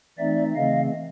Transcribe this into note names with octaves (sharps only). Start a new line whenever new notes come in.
E3 A3 C4 D#4 D5 E5
C#3 E3 A3 C4 D#5 F5